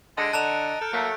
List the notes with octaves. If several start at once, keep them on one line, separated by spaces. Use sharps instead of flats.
D3 G#3 D#5 A6 C#7 D7
D3 A5 A#5 F#6 F7
A4 F6 G6 D7
F#3 A3 A#3